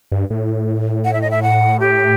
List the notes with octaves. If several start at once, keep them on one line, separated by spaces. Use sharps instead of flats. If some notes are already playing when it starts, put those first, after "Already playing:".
G2
A2
F#5
E5
D#5
E5
F#5
G4